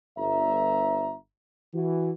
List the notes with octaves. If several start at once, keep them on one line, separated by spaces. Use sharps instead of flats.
G1 G2 E5 A#5
E3 F#4